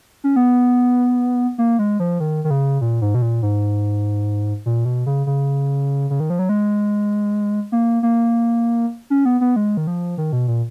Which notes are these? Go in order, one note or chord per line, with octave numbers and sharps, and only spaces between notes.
C#4
B3
A#3
G#3
F3
D#3
D#3
C#3
A#2
G#2
B2
A#2
G#2
A#2
B2
C#3
C#3
C#3
D#3
F3
F#3
G#3
A#3
A#3
C#4
B3
B3
G#3
D#3
F3
D#3
B2
A#2